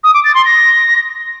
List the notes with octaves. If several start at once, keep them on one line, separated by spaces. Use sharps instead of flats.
D#6
D6
A6
C6
A#6